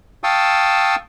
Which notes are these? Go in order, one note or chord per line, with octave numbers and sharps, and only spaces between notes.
F5 G5 A5 C#6 D#6 E6